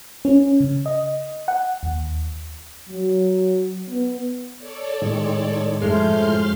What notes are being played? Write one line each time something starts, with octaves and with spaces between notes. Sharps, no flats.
C#4
C#3
D#5
F#5
D#2
F#3
B3
A4 C#5 D5
A2 D#3 G#3
F#2 A2 F3 G#3 A3 C6 F6 G6